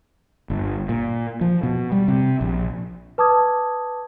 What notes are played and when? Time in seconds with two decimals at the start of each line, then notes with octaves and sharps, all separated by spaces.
0.50 G1
0.89 A#2
1.41 F3
1.63 B2
1.92 G3
2.08 C3
2.41 A#1
3.18 B4 A5 D6 D#6 G#6